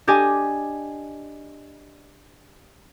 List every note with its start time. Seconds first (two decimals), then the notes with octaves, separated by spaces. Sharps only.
0.07 D4 G4 D#5 G#5